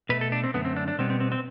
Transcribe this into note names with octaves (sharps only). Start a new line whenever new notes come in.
B2 A3 B4
A4
D4
C4
F#2 D3 A3 B3
C4
D4
D4
B2 G3 B3 C4
C4
C4
C4